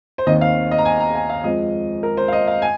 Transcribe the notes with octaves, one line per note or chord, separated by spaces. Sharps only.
C5
D#2 D#3 C4 D#5
F5
D#5
A#5
G#5
A#5
G#5
F5
F2 F3 G#3 C4 D#5
A#4
C5
F5
D#5
F5
G#5